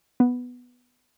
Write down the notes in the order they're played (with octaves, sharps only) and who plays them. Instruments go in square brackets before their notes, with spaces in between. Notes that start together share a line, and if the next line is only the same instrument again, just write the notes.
[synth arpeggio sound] B3